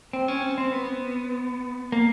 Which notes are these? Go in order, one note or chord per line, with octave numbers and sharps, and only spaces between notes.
C4
C#4
C4
C4
B3
A#3